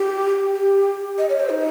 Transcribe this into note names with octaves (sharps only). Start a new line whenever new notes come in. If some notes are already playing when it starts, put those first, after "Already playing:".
Already playing: G4
G4
D#5
C#5
C5
D#4